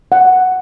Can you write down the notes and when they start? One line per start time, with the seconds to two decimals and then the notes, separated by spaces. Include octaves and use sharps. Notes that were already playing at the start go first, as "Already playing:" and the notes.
0.12 F#5